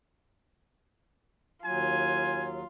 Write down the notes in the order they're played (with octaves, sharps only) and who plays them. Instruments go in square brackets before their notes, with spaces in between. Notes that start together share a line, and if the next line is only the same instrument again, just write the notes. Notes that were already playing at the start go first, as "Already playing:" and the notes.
[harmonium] D#2 F#3 [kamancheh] F4 [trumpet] G#5